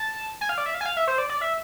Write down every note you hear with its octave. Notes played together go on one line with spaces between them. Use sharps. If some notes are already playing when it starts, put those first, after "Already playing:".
Already playing: A5
G#5
F5
D5
E5
F5
G#5
F5
E5
C5
D5
D5
E5